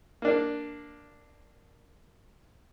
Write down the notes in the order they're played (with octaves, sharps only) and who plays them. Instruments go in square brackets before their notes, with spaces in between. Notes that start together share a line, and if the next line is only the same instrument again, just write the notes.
[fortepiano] A#3 D4